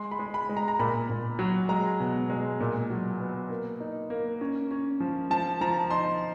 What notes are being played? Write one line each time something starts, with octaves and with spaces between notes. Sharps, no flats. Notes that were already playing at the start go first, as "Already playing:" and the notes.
Already playing: G#3 C6
B5
G#3
B5
G#3
A#5
A#5
A#2 B5
A#2
F#3
G#3 A#5
B2
G#3
A#2
F#3
B3
A#3
D#4
A#3
C#4
C#4
F3
F3 A5
F3 A#5
D#4 C6